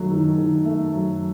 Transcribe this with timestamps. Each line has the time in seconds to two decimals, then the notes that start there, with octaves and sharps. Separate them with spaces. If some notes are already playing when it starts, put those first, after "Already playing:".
Already playing: D#3 F#3 A3
0.11 D#3
0.38 D#3
0.65 A3
0.92 F#3